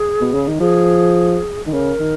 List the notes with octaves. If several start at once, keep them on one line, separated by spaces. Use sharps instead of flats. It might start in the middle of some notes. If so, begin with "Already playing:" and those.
Already playing: G#4
B2
C#3
D#3
F3 G#4
D#3
C#3 A#4
D#3